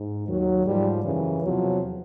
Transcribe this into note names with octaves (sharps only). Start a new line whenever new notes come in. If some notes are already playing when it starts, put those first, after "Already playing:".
Already playing: G#2
D#2 D#3 F#3
G#2 F3 G3
F#2 C#3 E3
E2 C3 F3 F#3